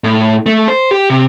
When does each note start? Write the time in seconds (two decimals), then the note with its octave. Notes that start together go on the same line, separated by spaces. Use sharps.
0.04 A2
0.46 A3
0.68 C5
0.91 G4
1.10 C3